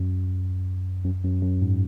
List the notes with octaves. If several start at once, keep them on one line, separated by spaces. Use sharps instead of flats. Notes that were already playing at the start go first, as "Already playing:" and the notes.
Already playing: F#2
F#2
F#2
F#2
G#2